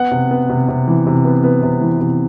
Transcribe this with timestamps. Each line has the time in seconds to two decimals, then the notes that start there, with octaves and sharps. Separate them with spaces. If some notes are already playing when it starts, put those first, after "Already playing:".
Already playing: B3 F#5
0.11 C3
0.31 B3
0.49 C3
0.68 C3
0.88 E3
1.07 C3
1.25 B3
1.44 B3
1.63 C3
1.81 E3
2.01 C3